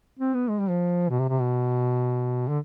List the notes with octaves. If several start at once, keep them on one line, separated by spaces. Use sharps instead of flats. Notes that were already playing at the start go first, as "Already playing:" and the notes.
C4
B3
G#3
G3
F3
B2
C3
C3
B2
D3